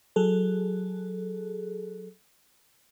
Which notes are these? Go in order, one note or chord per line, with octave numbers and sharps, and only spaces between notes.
F#3 G#4 A4